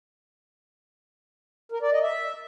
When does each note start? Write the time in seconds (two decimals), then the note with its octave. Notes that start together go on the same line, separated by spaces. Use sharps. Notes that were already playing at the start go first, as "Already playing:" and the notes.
1.72 A#4
1.82 D5
1.92 D#5
2.02 E5